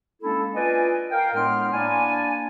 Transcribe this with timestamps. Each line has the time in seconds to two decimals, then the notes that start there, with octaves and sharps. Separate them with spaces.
0.22 G#3 A#3 C#4 D4 E4 A4
0.55 F4 B4 D5 D#5 G#5
1.11 A#4 F5 G5
1.35 A2 G#3 B3 D4 C6 F6
1.73 A#3 D4 E4 D5 G#5